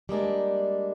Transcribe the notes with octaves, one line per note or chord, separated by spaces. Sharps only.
G3 G#3 A#3 D4